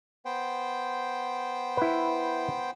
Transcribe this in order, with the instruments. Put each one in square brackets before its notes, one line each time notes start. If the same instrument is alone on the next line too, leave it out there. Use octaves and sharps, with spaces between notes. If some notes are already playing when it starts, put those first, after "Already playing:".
[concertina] B3 C5 G5
[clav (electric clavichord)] E4 B4